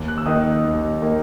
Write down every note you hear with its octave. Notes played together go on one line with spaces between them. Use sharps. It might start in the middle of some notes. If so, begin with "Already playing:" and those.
Already playing: D#2
F#6
E6
D#3 A#3 D#4 D#6
D#2
D#3 A#3 D#4